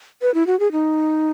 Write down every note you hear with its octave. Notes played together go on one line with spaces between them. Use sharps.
B4
E4
F#4
G#4
D#4